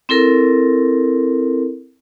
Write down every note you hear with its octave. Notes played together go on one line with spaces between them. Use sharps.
C4 E4 A4 A#4